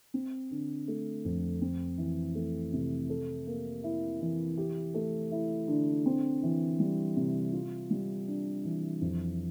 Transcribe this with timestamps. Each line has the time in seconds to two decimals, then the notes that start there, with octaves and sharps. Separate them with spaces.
0.14 C4
0.51 D3
0.88 A3
1.25 F2
1.61 C4
1.98 E3
2.35 A3
2.73 C3
3.09 A4
3.46 A#3
3.84 E4
4.21 E3
4.57 G4
4.94 A3
5.31 E4
5.68 D3
6.06 C4
6.43 E3
6.79 G3
7.16 C3
7.53 F4
7.90 G3
8.28 D4
8.64 E3
9.01 F2